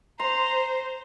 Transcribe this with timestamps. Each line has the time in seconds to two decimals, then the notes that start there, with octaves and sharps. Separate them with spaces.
0.19 C5 A#5 C6